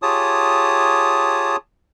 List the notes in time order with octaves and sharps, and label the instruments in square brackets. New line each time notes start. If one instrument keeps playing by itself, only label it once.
[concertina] F4 G4 G#4 C#5 A5 D#6